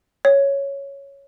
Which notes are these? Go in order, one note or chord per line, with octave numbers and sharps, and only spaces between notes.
C#5